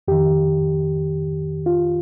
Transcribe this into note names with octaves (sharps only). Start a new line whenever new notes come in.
F2 D#3 G4
F4